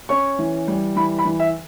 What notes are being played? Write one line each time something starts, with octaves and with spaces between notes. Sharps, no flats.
C#4 C#6
E3
G3
E3 B5
B5
E3
E5